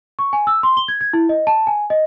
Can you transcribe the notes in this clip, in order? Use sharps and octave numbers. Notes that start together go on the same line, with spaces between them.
C#6
G#5
E6
C6
G7
G#6
G#6
E4
D#5
A5
G#5
D#5